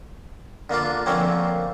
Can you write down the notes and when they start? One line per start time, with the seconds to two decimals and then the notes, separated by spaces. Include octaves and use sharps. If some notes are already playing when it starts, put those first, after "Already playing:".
0.70 D3 A#3 D4 F4
1.06 D3 F3 A3 A#3 C4 C#4